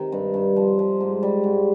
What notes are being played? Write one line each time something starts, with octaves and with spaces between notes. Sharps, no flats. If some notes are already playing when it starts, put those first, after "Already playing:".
Already playing: C3 D#3
G2
G2
F3
F3
G#2
G3
G#2